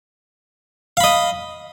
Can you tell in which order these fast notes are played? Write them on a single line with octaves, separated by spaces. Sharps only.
F5 B5 D#5